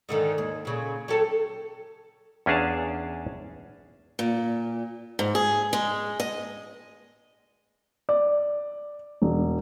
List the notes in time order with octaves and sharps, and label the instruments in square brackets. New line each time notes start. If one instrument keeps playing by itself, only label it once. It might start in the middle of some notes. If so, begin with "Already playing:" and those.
[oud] G#2 D3 D#3
D#2
A#2 C#3
F#3 G4 A4
[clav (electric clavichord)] E2 C#4 D4 G#4 F5 A5
[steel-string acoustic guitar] A#2
G#2
G#4
G#3
D#5
[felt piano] D5
E1